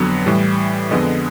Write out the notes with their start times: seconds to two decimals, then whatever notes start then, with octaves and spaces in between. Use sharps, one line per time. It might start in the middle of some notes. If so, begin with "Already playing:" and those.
Already playing: F2 D3 F#3 B3
0.26 A2 E3 G3
0.91 F2 D3 F3 G#3 B3 D#5